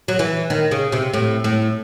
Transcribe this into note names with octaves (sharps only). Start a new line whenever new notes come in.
F#3
E3
D#3
C#3
C3
A2
A2